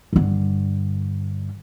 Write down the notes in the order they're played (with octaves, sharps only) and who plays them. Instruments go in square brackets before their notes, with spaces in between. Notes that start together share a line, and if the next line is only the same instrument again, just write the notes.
[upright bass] G2 D3